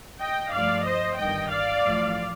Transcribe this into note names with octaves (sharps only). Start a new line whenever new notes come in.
D#5 G5
G2 F3 A3 D5 F5
C5 D#5
G1 G2 D#3 D#5 G5
D5 F5
A1 A2 F3